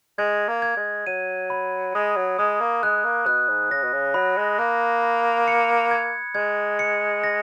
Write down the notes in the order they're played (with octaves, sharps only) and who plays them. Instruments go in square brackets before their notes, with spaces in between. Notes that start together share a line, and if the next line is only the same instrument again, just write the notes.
[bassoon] G#3 [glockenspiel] G#6
[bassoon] A#3
[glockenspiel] G#6
[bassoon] G#3
[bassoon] F#3 [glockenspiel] D#7
[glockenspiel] B5
[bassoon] G#3 [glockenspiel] D#6
[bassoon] F#3
[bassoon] G#3 [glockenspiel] D#6
[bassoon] A#3
[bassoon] G#3 [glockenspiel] F#6
[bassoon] A#3
[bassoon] B2 [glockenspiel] F#6
[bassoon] G#2
[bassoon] C#3 [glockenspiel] A#6
[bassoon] B2
C#3
[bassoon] F#3 [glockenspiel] B5
[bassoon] G#3
[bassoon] A#3 [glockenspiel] F#6
[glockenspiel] B5
C#7
G#6
[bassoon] G#3 [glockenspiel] G#6
[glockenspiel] C#7
A#6